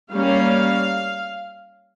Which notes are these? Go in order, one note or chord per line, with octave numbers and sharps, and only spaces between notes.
G3 A#3 C#4 F5